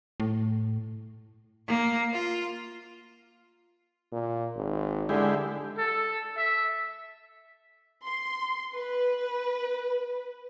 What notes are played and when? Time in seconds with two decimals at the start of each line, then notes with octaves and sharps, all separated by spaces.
0.20 A2
1.68 A#3
2.13 F4
4.12 A#2
4.56 G#1
5.09 D3 G#3 E4 G4
5.78 A4
6.37 E5
8.04 C6
8.75 B4